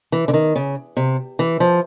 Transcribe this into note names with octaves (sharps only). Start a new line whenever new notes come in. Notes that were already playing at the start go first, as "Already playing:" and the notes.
E3
D3
D#3
C#3
C3
E3
F3